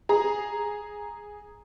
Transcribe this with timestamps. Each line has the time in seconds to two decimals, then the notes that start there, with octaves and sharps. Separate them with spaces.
0.09 G#4 A#5